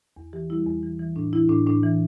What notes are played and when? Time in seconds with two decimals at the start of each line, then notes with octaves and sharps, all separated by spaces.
0.17 E2
0.33 E3 G4
0.50 G3 E4
0.67 E2
0.83 E3
0.99 E3
1.16 A2 D4
1.33 E3 E4
1.49 A2 D4
1.66 A2 D4
1.84 E3